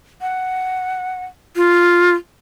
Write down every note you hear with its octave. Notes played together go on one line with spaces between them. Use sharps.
F#5
F4